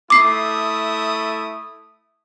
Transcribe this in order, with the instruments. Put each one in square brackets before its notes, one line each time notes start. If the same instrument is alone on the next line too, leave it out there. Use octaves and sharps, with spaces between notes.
[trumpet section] A3 E4 D#6 [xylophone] D6 C7